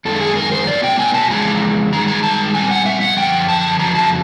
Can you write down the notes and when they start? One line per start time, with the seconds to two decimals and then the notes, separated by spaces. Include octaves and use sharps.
0.05 F#2 D#3 G#3 A4
0.21 G#4
0.36 A#4
0.52 C5
0.67 B2 F#3 A#3 D5
0.84 G5
0.99 G#5
1.14 A5
1.29 F2 C#3 E3 G#3 A#5
1.92 G2 D#3 G#3 A#5
2.08 A#5
2.23 A5
2.54 A#2 G3 C4 G#5
2.71 F#5
2.86 E5
3.01 F#5
3.17 F#2 D3 F3 G5
3.49 A5
3.79 F2 C#3 F#3 A#5
3.95 A5